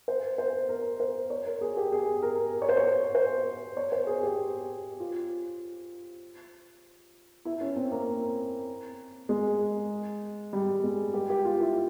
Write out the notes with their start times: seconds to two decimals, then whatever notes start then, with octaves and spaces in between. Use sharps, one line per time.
0.08 C5
0.38 C5
0.69 A#4
1.00 C5
1.30 C#5
1.46 A#4
1.61 G#4
1.77 G4
1.92 G#4
2.22 A#4
2.62 C#5
2.69 C5
2.77 C#5
3.15 C5
3.77 C#5
3.92 C5
4.07 G#4
4.23 G4
5.00 F4
7.45 E4
7.61 C#4
7.76 C4
7.91 A#3
9.29 G#3
10.53 G3
10.84 G#3
11.14 G4
11.30 G4
11.45 F4
11.60 E4